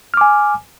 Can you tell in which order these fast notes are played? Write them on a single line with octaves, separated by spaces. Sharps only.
F6 D6 G#5